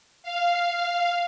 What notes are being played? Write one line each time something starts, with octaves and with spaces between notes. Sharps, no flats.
F5